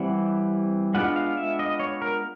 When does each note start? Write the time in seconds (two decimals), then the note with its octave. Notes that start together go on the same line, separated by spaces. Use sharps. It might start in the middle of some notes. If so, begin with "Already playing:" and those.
Already playing: E3 G3 C4 E4 F#5
0.94 G#3 B3 D4 F4 F#5
1.16 F5
1.37 E5
1.59 D#5
1.80 C#5
2.02 A#4